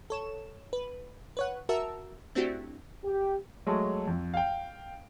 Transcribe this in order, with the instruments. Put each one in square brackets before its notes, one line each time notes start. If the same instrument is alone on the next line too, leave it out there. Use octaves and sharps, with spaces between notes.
[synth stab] A4 C#5 E7
B4
B4 C#5 F#5
F#4 A#4 E5 A5 E6
A3 C4 D4 E4 F#4 G4
[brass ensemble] G4
[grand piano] F#3 G#3 A3
F2
F5 G5